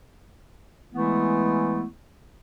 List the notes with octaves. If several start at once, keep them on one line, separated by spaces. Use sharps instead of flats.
E3 G#3 A3 B3 E4